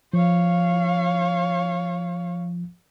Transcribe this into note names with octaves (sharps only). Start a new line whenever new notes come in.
F3 C#5 F5